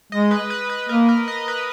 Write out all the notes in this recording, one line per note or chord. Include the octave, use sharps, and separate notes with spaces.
G#3 D#5
B4
B4
B4
A#3 A#4
A#4
D#5
B4